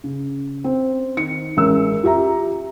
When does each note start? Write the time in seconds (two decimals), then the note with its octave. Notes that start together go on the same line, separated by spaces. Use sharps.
0.04 C#3
0.64 C4
1.17 D#3 C#7
1.57 A1 G#3 C#4 A#4 E6
2.03 F4 G4 E5 A#5